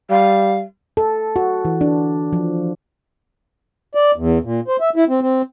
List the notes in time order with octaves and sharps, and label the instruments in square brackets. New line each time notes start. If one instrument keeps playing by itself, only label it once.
[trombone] G3 [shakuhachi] F5
[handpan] A4
F#4
E3
D4
F3
[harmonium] D5
E2
A#2
C5
E5
E4
C4
C4